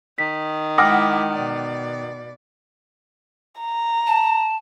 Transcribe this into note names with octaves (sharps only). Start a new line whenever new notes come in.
D#3 B6
G#3 E4 F#5 G5 D6 D#6 F6 A#6
B2 D5
A#5
A5